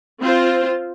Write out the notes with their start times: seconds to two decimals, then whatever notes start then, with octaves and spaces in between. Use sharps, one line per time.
0.20 C4 F4 C5